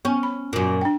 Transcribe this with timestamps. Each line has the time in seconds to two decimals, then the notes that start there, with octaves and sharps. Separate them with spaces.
0.05 B3 C#4
0.23 B5
0.53 F#2 A#2
0.81 D4 G5